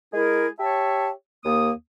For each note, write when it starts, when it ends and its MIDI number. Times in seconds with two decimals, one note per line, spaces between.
0.13 0.47 56
0.13 0.47 64
0.13 0.47 68
0.13 0.47 70
0.60 1.11 67
0.60 1.11 73
0.60 1.11 76
0.60 1.11 81
1.44 1.71 39
1.44 1.71 58
1.44 1.71 87